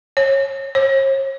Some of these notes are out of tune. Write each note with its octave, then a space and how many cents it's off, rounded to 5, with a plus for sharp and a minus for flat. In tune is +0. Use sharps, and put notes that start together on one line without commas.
C#5 -25
C#5 -45